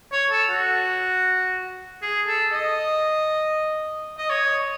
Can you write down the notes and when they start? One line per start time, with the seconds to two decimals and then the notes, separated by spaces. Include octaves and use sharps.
0.12 C#5
0.31 A4
0.50 F#4
2.02 G#4
2.27 A4
2.52 D#5
4.18 D#5
4.30 C#5